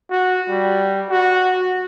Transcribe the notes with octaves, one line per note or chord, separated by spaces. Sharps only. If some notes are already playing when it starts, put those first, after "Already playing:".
F#4
G3
F#4